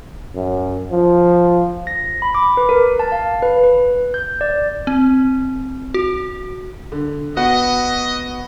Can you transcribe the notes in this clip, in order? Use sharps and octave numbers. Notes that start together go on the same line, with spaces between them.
F#2
F3
A#6
B5
D6
B4
A#4
A5
F5
B4
B4
G6
D5
C4
F#4
D3
B3 F#4 D#5 F#5